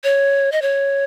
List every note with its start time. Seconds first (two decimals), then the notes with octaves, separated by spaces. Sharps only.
0.04 C#5
0.52 D#5
0.62 C#5